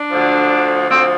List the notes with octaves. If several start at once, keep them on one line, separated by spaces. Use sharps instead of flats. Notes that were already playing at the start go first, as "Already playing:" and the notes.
Already playing: D4
D2 D3 F3
D2 D3 F3 C4